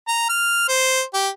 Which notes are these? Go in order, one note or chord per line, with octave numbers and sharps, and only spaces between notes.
A#5
F6
C5
G4